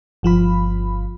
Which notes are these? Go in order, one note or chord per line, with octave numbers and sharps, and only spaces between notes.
G1 F3 F4 B5